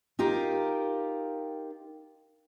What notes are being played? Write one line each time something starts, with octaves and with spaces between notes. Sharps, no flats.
D#4 F4 G4 A#4